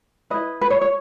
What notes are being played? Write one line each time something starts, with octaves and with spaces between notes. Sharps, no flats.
E4 B4 D#5
B4
C#5
C#5